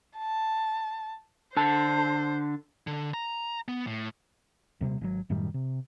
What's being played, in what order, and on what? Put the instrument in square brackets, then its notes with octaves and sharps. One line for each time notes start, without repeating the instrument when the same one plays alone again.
[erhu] A5
[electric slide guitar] D3 A5 [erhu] C5
[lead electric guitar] D3
A#5
B3
A2
[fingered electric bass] D#1 C3 G3 C4
G#1 F#3
F#2 A2 D#3 G3
C3